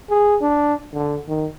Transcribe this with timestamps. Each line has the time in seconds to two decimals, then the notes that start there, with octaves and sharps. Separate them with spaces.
0.10 G#4
0.42 D4
0.94 D3
1.28 D#3